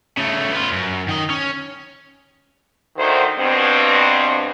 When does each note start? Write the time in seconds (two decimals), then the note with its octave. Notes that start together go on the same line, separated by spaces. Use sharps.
0.17 C#3 A3
0.52 B3 F4
0.73 F#2
1.08 D#3 D#5
1.30 C#4
2.97 D2 D#3 C5
3.39 G2 B2 C4